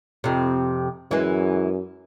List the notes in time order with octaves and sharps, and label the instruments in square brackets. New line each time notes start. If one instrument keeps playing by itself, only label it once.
[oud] F2 C3
[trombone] F#2 [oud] E3 G#3